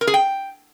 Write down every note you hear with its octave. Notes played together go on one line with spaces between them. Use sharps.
A#4
G#4
G5